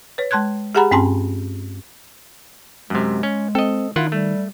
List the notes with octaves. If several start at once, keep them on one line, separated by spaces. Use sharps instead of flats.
B4 C#5
G#3 A5 C6 F#6 G#6
G4 G#4 F#5 G#5 A#5 B5
G2 C4 C#4 G#5 A5 C6
F#2 C3 G#3
C#4
C4 A4 D#5
D#3 E4 F4 F#5
G3 A3